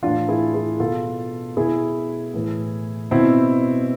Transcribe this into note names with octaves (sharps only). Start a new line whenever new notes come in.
A2 E3 D4 F4
E4 G#4
E4 G#4
B2 F4 A4
B2 E4 G#4
A2 E3
B2 C4 E4